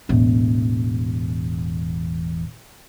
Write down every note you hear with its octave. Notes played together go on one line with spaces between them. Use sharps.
E1 A1